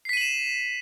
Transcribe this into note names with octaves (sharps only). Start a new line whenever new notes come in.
B6 C7 D#7 E7 F#7